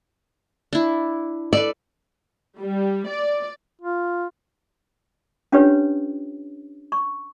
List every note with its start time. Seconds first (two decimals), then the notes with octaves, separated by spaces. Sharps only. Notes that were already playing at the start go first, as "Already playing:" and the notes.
0.73 D4 E4
1.53 A4 B4 D5
2.58 G3
3.08 D5
3.81 F4
5.52 C#4 D4 F4 G4 B4 C#5
6.92 C#6